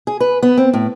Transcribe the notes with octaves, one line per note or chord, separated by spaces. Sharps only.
G#4
B4
B3
C4
A2